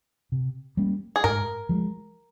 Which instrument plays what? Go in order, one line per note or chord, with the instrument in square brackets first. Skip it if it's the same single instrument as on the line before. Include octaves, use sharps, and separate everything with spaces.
[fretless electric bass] C3
G3 A#3 C#4
[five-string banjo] G#4
[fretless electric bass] G#2 [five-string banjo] A#4
[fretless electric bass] F3 G#3